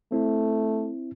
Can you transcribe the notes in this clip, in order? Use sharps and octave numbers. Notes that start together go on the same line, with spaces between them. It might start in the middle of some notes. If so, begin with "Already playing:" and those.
A3 C4 E4